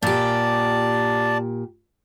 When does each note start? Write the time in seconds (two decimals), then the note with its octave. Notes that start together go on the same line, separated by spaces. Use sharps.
0.03 A#2 G4 D5 A5